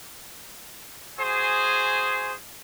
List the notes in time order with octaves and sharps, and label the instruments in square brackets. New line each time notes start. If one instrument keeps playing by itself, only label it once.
[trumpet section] F#4 G#4 C5 G#5 C6 D#6